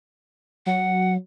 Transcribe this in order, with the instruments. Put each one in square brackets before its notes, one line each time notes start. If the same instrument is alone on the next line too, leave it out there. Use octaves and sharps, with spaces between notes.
[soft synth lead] F#3 [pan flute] F#5